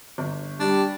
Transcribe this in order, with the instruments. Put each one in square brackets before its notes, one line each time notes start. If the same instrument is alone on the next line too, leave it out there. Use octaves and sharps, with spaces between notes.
[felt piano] G1
[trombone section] G3 [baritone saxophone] D4